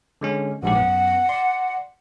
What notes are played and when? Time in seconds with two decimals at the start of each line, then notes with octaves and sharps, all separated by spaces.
0.21 D3 G#3 C#4
0.63 A#1 G#2 G4 F#5
0.76 F#2 B3
1.29 D5 C6